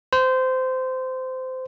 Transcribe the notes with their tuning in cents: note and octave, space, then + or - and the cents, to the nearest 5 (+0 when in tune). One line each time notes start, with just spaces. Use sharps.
C5 -20